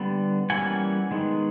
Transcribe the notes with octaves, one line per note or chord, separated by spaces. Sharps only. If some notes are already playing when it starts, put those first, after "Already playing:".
Already playing: D3 G3 B3
E3 G3 A#3 C#4 F#5 G#5
D#3 G#3 B3